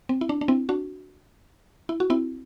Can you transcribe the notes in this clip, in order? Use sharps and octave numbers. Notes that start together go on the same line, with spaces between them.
C4
E4
D4
D4
C4 E4
D4 F#4
E4
F#4
C4 E4